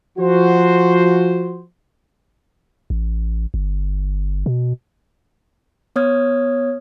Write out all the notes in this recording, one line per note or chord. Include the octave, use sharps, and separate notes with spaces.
F3 F#4 C5
A1
G1
B2
B3 C#5 D#6 F6 G#6